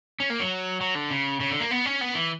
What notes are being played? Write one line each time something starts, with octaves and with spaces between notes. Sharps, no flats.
C#4
A#3
F#3
F#3
D3
C#3
C#3
D3
A#3
B3
C#4
B3
E3